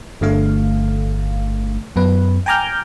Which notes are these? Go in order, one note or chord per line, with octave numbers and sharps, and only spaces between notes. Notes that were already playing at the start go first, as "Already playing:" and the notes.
G1 D3 A3 F5
F#2 B3 B4
G5 G#5 A#5 D6 F6 G6